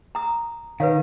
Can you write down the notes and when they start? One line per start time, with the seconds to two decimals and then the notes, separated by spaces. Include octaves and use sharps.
0.15 A#5 D#6
0.80 D#3 B4 C#5 F5